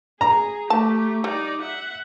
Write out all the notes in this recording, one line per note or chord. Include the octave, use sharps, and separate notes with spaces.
G#4 A#5
A3 G4 A5
G3 D#4 D5
E5 F#5